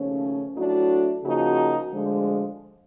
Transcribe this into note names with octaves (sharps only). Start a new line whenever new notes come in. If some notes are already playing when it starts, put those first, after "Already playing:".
Already playing: D#2 C#3 F3 A3 C#4
A2 F#3 A3 D4 F#4
C#3 F3 A#3 D#4 F#4
D2 D3 F3 G#3